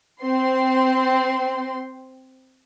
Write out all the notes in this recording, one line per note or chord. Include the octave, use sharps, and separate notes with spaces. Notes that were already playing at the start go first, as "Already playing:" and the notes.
C4 C6